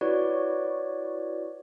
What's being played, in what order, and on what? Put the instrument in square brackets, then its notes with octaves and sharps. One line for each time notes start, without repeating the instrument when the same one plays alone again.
[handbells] E4 F#4 B4 C#5 D5